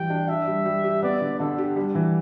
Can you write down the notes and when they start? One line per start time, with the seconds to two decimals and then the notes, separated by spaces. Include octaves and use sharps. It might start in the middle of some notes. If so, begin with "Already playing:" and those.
Already playing: E3 G3 G4 G5
0.10 D4
0.28 D4 E5
0.47 G3
0.65 G3
0.84 G4
1.03 B3 D5
1.21 D3
1.39 D3 A4
1.58 G4
1.76 G3 D4
1.95 E3